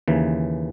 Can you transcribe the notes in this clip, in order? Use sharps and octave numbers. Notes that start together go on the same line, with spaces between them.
D#2 C#3 E3